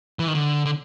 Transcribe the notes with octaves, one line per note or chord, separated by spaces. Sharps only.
E3
D#3
D3
D3